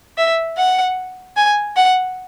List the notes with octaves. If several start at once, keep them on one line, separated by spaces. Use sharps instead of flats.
E5
F#5
G#5
F#5